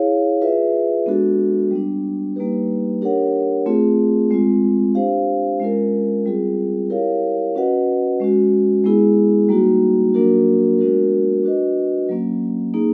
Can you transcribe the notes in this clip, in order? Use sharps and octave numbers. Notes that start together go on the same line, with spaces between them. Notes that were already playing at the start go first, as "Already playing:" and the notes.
Already playing: E4 G#4 C#5 F5
F4 G#4 B4 E5
G#3 B3 D4 F#4 A4
G3 B3 D4
G3 A#3 D#4 G4 B4
D4 G4 A#4 C#5 F#5
A3 C4 F4 G#4
G#3 C4 F4
D4 G4 C5 F5
G#3 C#4 F4 A#4
G3 C4 F4 G#4
E4 G4 A#4 C#5 F5
C#4 F#4 B4 D#5 F#5
G#3 C#4 F#4
G#3 B3 E4 G#4
G3 A#3 D#4 F#4
F#3 A#3 D4 F#4 A#4
G#3 B3 D4 F#4 A#4
D4 F#4 B4 D#5
F#3 A#3 C#4
A#3 D#4 G#4